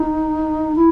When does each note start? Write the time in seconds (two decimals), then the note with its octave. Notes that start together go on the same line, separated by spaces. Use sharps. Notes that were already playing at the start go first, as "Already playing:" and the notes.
Already playing: D#4
0.76 E4